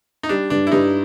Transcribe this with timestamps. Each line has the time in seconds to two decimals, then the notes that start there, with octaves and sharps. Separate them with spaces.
0.23 D#4
0.29 G3 D4
0.50 G2 D4
0.67 E4
0.72 G2 D#4